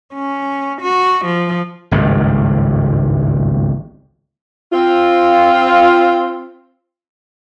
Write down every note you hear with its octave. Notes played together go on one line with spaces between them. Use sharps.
C#4
F#4
F3
G#1 C#2 G2
C4 F4